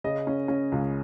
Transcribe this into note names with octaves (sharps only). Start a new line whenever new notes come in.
C#3 D#5
C#4
C#4
C#2